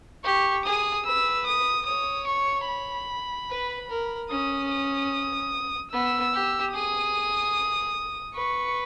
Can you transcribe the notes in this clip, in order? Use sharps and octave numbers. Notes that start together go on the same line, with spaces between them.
G4 C#6
G#4 D#6
B4 E6
D#6
C#5 D#6
C#6
B5
B4
A#4
C#4 D#6
D#6
B3 E6
G4
G#4 D#6
B4 C#6